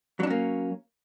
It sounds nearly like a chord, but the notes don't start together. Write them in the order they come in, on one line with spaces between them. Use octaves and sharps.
F#3 D4 C#4 A#3